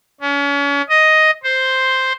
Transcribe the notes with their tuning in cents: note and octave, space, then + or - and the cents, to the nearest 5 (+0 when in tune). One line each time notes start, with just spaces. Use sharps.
C#4 +35
D#5 +5
C5 +0